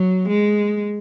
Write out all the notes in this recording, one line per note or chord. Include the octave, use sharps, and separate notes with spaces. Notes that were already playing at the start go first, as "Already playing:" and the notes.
Already playing: F#3
G#3